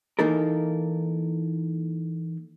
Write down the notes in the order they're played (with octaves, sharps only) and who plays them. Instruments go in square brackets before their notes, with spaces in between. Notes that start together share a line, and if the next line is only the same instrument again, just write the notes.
[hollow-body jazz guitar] E3 A#3 D#4 A4 A#4